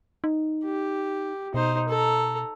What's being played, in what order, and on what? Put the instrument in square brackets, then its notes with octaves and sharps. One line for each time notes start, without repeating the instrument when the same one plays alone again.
[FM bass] D#4
[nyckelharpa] G4
[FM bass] B2 [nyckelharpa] D#4 C5
[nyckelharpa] A4 A#5